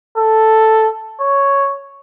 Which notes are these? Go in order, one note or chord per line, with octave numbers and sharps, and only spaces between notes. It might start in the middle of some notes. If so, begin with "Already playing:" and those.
A4
C#5